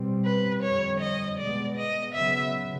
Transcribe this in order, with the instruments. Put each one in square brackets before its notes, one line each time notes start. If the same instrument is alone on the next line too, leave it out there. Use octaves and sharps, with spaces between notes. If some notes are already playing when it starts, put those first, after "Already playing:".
Already playing: [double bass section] B2 G3 C4
[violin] B4
[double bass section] F2 D3 G3 C4 [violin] C#5
[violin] D#5
[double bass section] B2 G#3 B3 [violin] D5
[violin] D#5
[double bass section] C#3 F#3 B3 [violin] E5